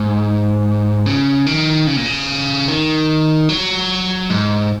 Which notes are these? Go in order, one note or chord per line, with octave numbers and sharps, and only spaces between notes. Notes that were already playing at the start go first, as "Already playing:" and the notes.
Already playing: G#2
C#3
D#3
C#3
A#2
C#3
D#3
F#3
G#2